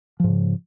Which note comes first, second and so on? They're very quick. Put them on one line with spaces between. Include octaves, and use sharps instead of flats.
F3 G#2 C#3